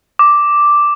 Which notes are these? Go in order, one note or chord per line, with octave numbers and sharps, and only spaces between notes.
D6